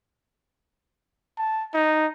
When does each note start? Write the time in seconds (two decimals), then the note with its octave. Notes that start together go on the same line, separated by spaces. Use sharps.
1.38 A5
1.74 D#4